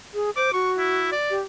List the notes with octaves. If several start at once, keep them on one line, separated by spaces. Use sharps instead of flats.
G#4
C5 D6
F#4 C#6
E4
D5
G4